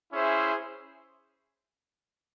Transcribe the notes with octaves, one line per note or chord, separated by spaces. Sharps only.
C#4 E4 G#4 C5 E5